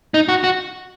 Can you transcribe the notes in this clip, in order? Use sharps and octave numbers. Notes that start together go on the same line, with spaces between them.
D#4
F#4
F#4